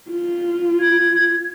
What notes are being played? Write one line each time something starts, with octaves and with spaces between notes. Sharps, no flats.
F4
G#6